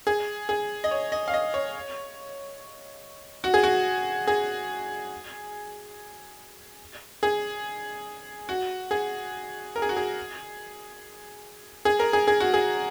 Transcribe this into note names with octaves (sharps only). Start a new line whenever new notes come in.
G#4
G#4
D#5
C#5
D#5
F5
D#5
C#5
F#4
G#4
F#4
G#4
G#4
F#4
G#4
A#4
G#4
F#4
G#4
G#4
A#4
G#4
G#4
F#4
G#4